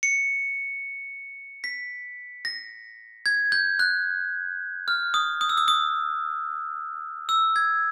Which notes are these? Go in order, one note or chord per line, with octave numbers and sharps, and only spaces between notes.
C#7
B6
A#6
G#6
G6
F#6
F6
D#6
D#6
E6
D#6
D#6
E6
G#6